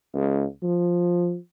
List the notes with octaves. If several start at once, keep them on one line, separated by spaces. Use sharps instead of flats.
C#2
F3